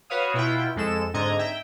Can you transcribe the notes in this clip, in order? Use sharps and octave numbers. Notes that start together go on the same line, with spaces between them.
F#4 B4 C#5 F5 D#6
B2 E4 F4 F#5 G5
F2 G#3 A4 E7
G#2 D3 C4 D#5 A#5 G#6
E5 G5